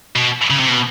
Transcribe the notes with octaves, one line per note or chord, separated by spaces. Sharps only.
B2
C#3
C3
B2